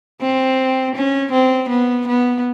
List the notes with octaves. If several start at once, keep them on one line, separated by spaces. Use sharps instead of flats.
C4
C#4
C4
B3
B3